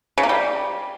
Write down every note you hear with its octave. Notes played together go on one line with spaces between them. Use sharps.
C#3
A#3
G3